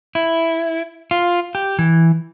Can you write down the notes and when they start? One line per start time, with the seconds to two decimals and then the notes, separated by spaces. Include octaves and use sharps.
0.15 E4
1.11 F4
1.55 G4
1.79 E3